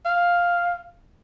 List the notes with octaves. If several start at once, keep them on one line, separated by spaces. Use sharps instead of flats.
F5